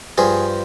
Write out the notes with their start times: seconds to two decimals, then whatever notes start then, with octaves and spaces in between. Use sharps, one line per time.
0.18 G2 F3 G#4